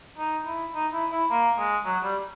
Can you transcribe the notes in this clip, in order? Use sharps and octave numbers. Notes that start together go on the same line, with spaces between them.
D#4
E4
D#4
E4
E4
A#3
G#3
F#3
G3